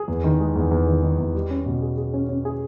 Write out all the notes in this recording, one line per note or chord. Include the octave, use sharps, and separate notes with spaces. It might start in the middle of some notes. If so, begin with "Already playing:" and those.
Already playing: G#4
E2
D#3
G#3
E2
E2
D#3
D#3
E2
G3
C#4
B2
G#4
G#4
C#4
C#4
G#4